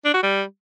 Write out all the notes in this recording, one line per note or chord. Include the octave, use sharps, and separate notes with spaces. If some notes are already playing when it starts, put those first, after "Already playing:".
D4
F#4
G3